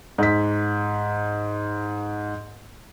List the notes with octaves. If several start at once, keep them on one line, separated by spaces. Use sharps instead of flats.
G#2 B6